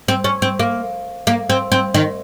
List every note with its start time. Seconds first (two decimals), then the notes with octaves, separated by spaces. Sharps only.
0.08 C4
0.24 C#4
0.42 C4
0.59 A#3
1.27 A#3
1.50 C4
1.72 C4
1.94 D#3